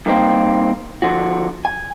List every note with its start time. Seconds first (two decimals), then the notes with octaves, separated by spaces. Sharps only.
0.06 G2 D#3 A#3 C4
1.02 D3 F3 F#4
1.65 G#5